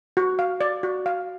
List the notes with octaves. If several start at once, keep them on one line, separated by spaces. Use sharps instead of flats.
F#4
F5
D5
F#4
F5